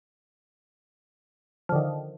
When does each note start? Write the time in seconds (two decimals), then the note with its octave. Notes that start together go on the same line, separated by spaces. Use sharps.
1.69 F3
1.72 D3
1.75 D#3